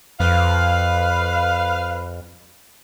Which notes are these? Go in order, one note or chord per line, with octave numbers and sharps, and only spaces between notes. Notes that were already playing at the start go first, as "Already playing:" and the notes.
F2 B4 F5